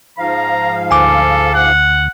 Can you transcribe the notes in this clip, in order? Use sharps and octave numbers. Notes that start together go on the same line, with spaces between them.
G#2 F3 F5 A#5
D2 A4 G#5 D6
F#5